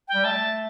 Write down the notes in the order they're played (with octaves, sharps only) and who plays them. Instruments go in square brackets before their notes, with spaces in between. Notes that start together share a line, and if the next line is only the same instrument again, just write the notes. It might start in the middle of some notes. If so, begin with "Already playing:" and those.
[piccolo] G5
[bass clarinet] G3
[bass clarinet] A3 [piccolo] A5